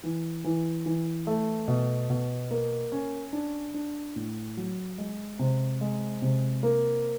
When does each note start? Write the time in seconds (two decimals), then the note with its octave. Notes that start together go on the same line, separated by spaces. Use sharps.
0.03 E3
0.44 E3
0.86 E3
1.27 A3
1.68 B2
2.10 B2
2.51 A#3
2.92 C#4
3.33 D4
3.74 D4
4.16 A2
4.57 F#3
4.98 G#3
5.39 C3
5.81 G#3
6.22 C3
6.63 A#3